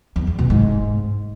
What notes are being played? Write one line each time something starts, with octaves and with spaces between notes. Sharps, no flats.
E2
E2
B2
G#2